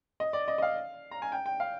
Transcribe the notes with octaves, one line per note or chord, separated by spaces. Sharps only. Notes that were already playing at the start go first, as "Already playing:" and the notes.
D#5
D5
D#5
D#5
F5
A#5
G#5
G5
G5
F5